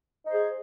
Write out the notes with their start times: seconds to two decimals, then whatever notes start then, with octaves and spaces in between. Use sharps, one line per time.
0.25 D#4
0.29 C5
0.32 G#4